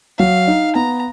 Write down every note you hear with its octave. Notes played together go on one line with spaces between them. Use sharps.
F#3 F5
D#4
B3 A#5